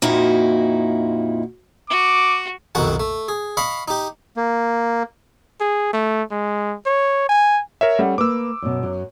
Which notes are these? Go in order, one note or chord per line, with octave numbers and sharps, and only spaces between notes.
F2 A#2 D#4 E4 F#4
F#4 D6
B1 F2 C3 D#3 F#4 F#5
A3
G#4
D#5 F5 B5 C#6
D#4 G4
A#3
G#4
A3
G#3
C#5
G#5
A#4 C#5 E5
G3 C#4 A4 F#5
A#3 A#4 B4 D6 E6
F#2 B2
F#2 F#3